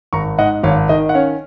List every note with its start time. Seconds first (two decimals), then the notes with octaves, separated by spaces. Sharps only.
0.13 G#1 A#5 C#6
0.38 G#2 D#5 F#5
0.63 G#1 C#5 F5
0.89 D#3 D#5
1.09 F#5
1.14 C#4 C#5 F5